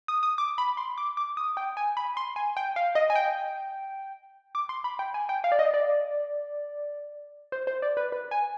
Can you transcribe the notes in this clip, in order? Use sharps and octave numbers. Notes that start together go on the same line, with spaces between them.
D#6
D#6
D6
B5
C6
D6
D6
D#6
G5
G#5
B5
C6
G#5
G5
F5
D#5
G#5
G5
D6
C6
B5
G5
G#5
G5
F5
D5
D#5
D5
C5
C5
D5
B4
B4
G#5